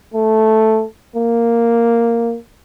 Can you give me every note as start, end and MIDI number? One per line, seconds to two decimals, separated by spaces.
0.14 0.84 57
1.16 2.36 58